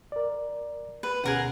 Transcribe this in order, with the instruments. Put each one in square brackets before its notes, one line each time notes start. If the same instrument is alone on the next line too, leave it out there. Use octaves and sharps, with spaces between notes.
[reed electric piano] A#4 D5
[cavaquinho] B4
[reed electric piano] D2 B2 C#4 [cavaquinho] G#4 A#4 F#5